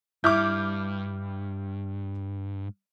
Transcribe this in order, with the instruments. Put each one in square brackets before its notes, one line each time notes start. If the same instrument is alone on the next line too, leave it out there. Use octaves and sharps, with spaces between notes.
[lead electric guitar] G2 [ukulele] E4 [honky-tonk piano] D6 F6 G6